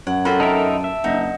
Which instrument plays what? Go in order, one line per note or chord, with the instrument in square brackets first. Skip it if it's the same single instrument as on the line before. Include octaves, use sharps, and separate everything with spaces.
[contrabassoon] F#2 [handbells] C#5 [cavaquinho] F#5
[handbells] C4 A4 A#4 [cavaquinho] F4 F#5 B5
[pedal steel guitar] D#4 A#4 E5 [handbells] A5 D7
[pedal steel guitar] E5
[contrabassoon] F#1 [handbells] D4 D#5 F#5 [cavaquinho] D#4